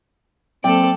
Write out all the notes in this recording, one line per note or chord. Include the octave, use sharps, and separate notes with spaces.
F#3 A#3 C4 A4 D5 G5